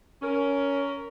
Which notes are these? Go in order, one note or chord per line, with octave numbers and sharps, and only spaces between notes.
C#4 A#4